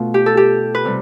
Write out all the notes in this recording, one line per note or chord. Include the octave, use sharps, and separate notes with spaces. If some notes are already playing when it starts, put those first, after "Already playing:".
Already playing: B2 A3 F4
G4
A4
G4
B4
C3 G3